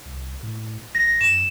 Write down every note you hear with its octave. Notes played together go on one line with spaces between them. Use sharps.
C2
A2
A1 A#6
F#2 E7